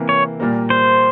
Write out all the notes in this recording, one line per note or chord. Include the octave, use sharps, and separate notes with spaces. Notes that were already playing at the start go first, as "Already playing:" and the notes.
Already playing: C3 E3 A#3
C#5
A#2 G3 A#3
C5